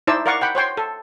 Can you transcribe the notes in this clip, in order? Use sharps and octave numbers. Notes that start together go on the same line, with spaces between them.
D#4 E4 C5 D5 A5 E6
A#4 D5 F5 F#5 C#6 D6
F#5 G5 B5
C5 C#5 G5 C6
A4